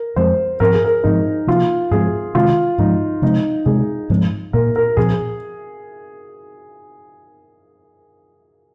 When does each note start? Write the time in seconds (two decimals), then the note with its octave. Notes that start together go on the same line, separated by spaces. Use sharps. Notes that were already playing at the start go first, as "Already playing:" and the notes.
Already playing: A#4
0.16 F2 F3 G#3 C4 C5
0.60 G#2 F3 C4 A#4
0.73 G#4
0.84 A#4
1.04 G#2 F3 C4 D#4
1.47 C3 F3 A#3 F4
1.91 G#2 F3 G#3 C4 G#4
2.35 C3 D#3 G#3 C4 F4
2.78 G#2 F3 G#3 D#4
3.22 C3 F3 G#3 C4 D#4
3.66 C3 G#3 C4 G#4
4.10 G#2 F3 G#3 C4
4.53 A#2 A#3 A#4
4.76 A#4
4.97 A#2 F3 C4 G#4